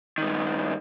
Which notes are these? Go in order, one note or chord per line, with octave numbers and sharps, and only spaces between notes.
G2 D#3